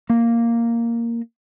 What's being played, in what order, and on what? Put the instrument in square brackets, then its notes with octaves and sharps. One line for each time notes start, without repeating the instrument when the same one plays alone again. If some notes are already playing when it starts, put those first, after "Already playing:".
[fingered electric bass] A#3